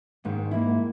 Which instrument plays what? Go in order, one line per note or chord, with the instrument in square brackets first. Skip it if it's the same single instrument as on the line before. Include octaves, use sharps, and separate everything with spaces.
[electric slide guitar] G#2 [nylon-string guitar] D#3
[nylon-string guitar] A#3 E4